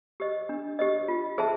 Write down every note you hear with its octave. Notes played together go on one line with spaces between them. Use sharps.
G4 C5 D#5
D4
G4 C5 D#5
F4
G#4 C5 E5 A5